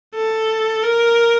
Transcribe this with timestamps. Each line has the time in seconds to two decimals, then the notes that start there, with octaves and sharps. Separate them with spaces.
0.16 A4
0.83 A#4